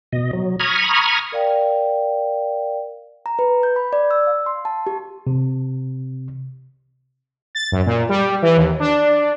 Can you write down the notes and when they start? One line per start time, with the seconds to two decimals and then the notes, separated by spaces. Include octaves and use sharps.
0.12 B2 D#5
0.33 F#3
0.60 A#5 B5 C#6 D#6 F6 G#6
1.32 A#4 D5 F5 G5
3.26 A#5
3.39 B4
3.63 G6
3.76 B5
3.93 D5
4.11 E6
4.27 F5
4.46 C6
4.65 A5
4.87 G4
5.27 C3
7.55 A6
7.72 F#2
7.86 A#2
8.09 G3
8.42 E3
8.57 D#2
8.80 D4